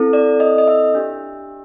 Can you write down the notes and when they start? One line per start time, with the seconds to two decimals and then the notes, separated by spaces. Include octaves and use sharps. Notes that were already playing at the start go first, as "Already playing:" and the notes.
Already playing: C4 E4 A4
0.13 D5
0.40 D#5
0.58 D#5
0.68 E5
0.95 D4 G4